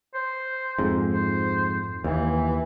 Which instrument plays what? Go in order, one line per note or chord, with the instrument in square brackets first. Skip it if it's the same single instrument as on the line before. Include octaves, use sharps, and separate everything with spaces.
[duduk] C5
[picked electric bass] F2 G#2
[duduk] C5
[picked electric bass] D#2 [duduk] E3